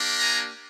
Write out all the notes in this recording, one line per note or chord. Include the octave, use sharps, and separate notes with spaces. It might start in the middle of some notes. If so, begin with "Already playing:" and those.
Already playing: A#3 D4 G4
G#5 A#5